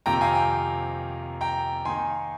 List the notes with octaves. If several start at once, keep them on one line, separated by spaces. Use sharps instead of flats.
F2 C3 D#3 A#3 G5 A#5
F5 G#5
G5
G5 A#5
D#3 A#3 D#4 G#5 C6